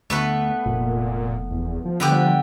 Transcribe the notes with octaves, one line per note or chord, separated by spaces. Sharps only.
D2 A3 B3 B4
F1 A#2
E2
F3
D3 B3 G4
G3